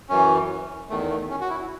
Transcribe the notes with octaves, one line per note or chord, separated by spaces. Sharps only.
F#2 E3 C#4
E2 D#3 A3
A3
C#4
F#4
E4